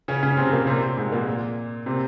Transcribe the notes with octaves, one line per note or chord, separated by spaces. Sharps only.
C#3 C#4
C#3 C#4
C3 C4
A#2 A#3
C3 C4
C3 C4
G#2 G#3
A#2 A#3
C3 C4